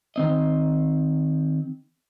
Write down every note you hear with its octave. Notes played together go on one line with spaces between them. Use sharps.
D#3 C4 D#5